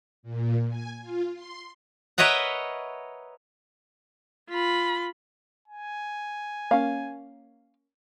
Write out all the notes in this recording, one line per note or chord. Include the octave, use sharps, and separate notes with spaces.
A#2
G#5
F4
C6
A#4 B4 C#5 D#5 E5 F#5
F4 B5
G#5
A#3 C#4 F5